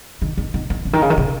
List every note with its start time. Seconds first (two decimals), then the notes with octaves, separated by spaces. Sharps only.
0.22 D#3
0.38 D#3
0.54 D#3
0.70 D#3
0.85 C#3
0.93 D#3
1.02 C#3
1.10 D#3
1.18 C#3